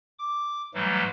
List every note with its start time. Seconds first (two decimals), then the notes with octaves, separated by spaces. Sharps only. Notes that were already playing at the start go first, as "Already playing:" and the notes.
0.19 D6
0.74 G#2 E3 F#3 G3 A3